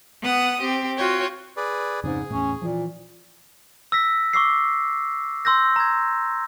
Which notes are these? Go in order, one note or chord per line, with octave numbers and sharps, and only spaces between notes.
B3 F#5 D#6
C4 G4
F4 F#4 C#5 G5
G#4 B4 D5
F2 G#2 C#3 C4 G#4
E2 A2 C#4
A#2 E3 F3
E6 A#6 B6
C#6 D6 E6 C7
C6 E6 G6 A#6
A#5 G#6